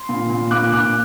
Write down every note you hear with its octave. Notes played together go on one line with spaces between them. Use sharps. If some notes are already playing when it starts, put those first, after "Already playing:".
Already playing: C6
A#2
A#2
A#2 D6 F#6
A#2 D6 F#6